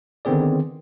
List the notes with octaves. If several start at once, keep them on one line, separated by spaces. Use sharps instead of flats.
D3 D#3 B3 C4 G#4 D5